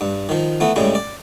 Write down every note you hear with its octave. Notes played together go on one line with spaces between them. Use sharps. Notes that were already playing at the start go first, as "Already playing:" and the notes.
G2
D#3 F3
E3 A3 B3
A2 C#3 G3 G#3
D5